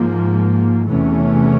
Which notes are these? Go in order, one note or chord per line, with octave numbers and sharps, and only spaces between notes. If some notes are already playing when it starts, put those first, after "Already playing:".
Already playing: G#2 F3 A#3
E2 C3 E3 A3 C#4